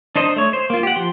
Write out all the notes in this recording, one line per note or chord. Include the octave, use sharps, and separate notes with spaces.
D4 D#4 C5 D#5
A3 C#5
C5
A#3 F4
G4 F#5
F3 G4 C6